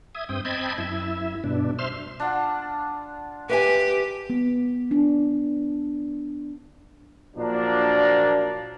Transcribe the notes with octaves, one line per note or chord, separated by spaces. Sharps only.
E5 D#6 G#6
G2 C4 G5 D#6
C4 D#5 G5 A5 B5 G#6
F#2 E4 E5
G2 B2 D4
C5 E5 C6 F6
D4 F4 F#5
G4 B4 E5 G#5
B3
D4
A#2 F3 F#3 A#3 D4